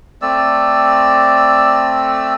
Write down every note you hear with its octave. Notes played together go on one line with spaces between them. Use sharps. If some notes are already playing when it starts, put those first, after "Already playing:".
A3 C4 D5 E6